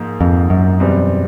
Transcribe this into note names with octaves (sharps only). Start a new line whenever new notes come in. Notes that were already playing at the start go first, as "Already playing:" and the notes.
Already playing: G#2 F3 A#3
F2
F#2
E2 B2 G3 C4